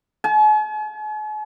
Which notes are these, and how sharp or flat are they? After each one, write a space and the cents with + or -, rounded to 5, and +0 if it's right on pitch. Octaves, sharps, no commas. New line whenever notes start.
G#5 +45